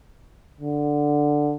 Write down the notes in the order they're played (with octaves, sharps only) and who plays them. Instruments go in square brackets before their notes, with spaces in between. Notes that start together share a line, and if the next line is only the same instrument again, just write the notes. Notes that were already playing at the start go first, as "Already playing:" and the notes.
[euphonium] D3